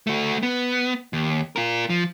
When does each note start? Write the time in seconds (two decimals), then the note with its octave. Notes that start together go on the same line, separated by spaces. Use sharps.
0.07 A3 F#4
0.43 B3
1.13 D#2
1.56 F4 A#4
1.90 F3